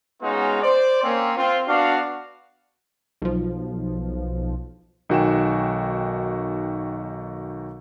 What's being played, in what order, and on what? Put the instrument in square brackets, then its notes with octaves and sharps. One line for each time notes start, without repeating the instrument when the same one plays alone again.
[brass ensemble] G#3 B3 C#4 D#4 F4 F#4
C5 D5
A#3 C4 C#4
C4 F4
B3 D4 F#4 F5
[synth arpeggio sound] B1 F3
[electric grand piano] B1 D#3 F#4 G5 G#5 E7